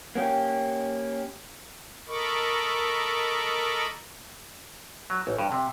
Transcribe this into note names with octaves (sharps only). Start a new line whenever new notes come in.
A#3 C#4 G4
A4 A#4 D#5 B5 C#6 D6
F#3
A1
G2
C3